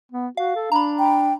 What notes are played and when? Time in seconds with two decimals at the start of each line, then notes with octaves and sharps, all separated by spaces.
0.12 B3
0.37 F#4 F5
0.56 A4
0.72 D4 A#5 B5
0.99 G5